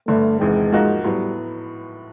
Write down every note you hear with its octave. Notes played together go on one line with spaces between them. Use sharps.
G1 G2 D3 A3
E1 E2 C3 D#3 G#3
G#2 F3 A#3 D#4 F#4
A2 F#3 G3 B3